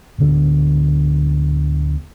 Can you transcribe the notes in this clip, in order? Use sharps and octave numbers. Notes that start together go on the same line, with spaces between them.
D1 G#2 D3 B3